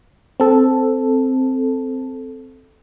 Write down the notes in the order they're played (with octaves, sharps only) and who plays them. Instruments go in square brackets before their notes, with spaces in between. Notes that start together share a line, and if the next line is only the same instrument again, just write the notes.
[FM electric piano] C4 A4